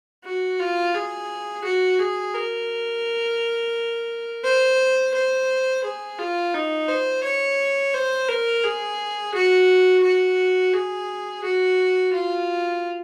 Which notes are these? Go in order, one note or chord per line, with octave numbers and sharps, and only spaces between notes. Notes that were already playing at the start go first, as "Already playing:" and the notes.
F#4
F4
G#4
F#4
G#4
A#4
C5
C5
G#4
F4
D#4
C5
C#5
C5
A#4
G#4
F#4
F#4
G#4
F#4
F4